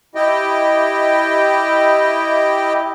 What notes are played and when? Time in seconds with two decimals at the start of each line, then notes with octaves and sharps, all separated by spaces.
0.15 E4 G4 D#5 G5